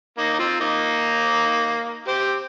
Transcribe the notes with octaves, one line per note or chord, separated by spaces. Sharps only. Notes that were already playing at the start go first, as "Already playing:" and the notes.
A#3 D#4
D#4
C4 F4
A#3 D#4
G4 C5